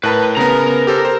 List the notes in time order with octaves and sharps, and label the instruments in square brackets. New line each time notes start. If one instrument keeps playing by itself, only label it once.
[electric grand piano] A2 A#4 A5 [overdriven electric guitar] B4
[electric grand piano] C#3 B3 [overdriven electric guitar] A#4 A#5
[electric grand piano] G4 A4 C5
C5